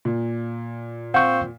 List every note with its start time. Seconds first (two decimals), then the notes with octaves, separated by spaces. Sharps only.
0.05 A#2
1.14 C4 F5 F#5 C#6 G6